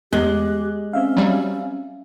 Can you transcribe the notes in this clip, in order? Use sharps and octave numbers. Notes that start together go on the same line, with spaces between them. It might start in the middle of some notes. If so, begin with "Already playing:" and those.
E2 G#3 G4 F#6
C4 C#4 E5 F5
F#3 G3